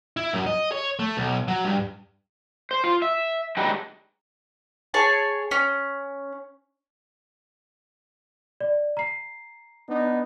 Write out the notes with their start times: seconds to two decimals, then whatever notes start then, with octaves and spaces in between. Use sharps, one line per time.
0.17 E4
0.33 F#2
0.46 D#5
0.72 C#5
0.99 A3
1.17 B1
1.48 F#3
1.65 G2
2.71 C5
2.84 F4
3.02 E5
3.57 F#3 G#3 D4 D#4 G4 B4
4.94 G#4 C#5 G#5 A5
5.51 C#4
8.61 D5
8.97 A#5 C7
9.88 B3 D4 D#4